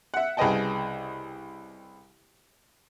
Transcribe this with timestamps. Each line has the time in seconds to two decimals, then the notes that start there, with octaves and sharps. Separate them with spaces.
0.14 E5 F#5
0.37 C2 C#3 B4 D#5 G5 A5